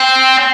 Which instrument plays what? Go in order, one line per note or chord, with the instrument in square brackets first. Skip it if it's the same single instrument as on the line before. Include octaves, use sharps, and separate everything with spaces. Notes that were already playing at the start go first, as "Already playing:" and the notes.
Already playing: [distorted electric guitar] C4